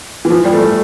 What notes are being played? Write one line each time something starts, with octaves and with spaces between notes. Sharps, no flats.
E3
F3
G3
A3